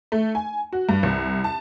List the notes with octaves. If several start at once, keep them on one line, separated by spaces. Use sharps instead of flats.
A3
G#5
F#4
G2
C2
A5